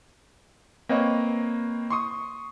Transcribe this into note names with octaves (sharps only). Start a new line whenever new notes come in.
A#3 C4 B4 C#5 D#5
C6 C#6 D#6